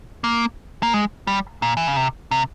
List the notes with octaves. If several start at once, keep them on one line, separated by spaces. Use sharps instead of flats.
A#3
A#3
G#3
G3
A#2
E3
C#3
C3
C3